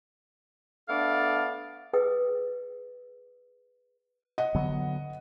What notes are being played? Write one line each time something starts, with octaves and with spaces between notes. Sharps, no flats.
A3 B3 D4 A4 D5 F5
G#4 B4 D#5 G5 D#6 E6
D#5 F#5
D3 F#3 B3